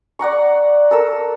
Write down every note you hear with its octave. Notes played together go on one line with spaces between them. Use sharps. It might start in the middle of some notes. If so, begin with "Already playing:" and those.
D5 F#5 A#5 C#6
A4 A#4 E6